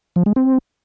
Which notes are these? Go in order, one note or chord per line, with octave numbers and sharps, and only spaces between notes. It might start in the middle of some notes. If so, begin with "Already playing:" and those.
F3
G#3
C4